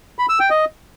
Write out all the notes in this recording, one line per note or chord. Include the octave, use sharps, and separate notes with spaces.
B5
E6
G5
D#5